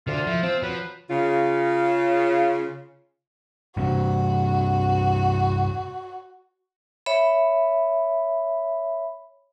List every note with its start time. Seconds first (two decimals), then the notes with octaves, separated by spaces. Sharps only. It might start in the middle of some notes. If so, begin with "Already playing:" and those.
0.07 D2 D3 F4
0.27 F3 E4
0.43 F3 C4
0.63 F3 F#3 B4
1.10 C#3 F4
3.77 G2 C3 F#4
7.06 C#5 E5 B5